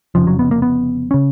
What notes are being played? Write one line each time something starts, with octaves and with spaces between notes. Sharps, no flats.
F1 F2 C#3 F3
F#3
B3
A#3
B3
C#3 C#4